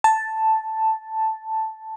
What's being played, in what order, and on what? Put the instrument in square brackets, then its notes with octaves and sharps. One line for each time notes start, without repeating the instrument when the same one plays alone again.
[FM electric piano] A5